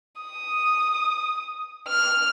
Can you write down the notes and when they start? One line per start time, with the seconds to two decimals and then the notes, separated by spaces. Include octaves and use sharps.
0.21 D#6
1.88 F6